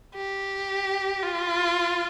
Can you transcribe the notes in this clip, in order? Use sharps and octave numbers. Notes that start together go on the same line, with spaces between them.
G4
F4